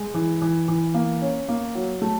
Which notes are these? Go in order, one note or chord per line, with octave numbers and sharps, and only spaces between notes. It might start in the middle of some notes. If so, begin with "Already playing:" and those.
Already playing: G#3
E3
E3
E3
A#3
C#4
A#3
F#3
A3